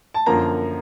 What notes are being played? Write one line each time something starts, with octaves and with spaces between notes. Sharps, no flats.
A5
F#2 D3 F3 A#3 A#5